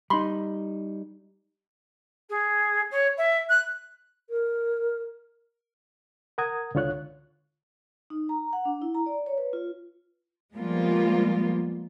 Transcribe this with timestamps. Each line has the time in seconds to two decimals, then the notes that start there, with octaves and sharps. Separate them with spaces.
0.10 G3 D#4 B5 C6
2.29 G#4
2.91 C#5
3.17 E5
3.49 F#6
4.29 A#4
6.38 A#4 F#5 A#5 D#6 G#6
6.75 C#2 D3 F4 C#5 F#6
8.10 D#4
8.29 A#5
8.53 F#5
8.65 D4
8.82 E4
8.94 A#5
9.06 D5
9.26 C#5
9.38 B4
9.53 F4
10.55 F3 G3 G#3 A#3 B3 F4